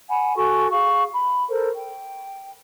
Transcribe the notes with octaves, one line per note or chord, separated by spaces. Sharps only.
F#5 G#5 B5
F#4 A4 G#5 C#6
G#4 F5 C#6
B5
A4 A#4 C5
G5